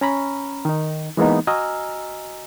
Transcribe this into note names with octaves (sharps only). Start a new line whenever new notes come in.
C#4 A#5 B5
D#3 D#4
E3 G#3 A#3 B3 D#4
F#4 D#5 G#5 A#5 E6 F6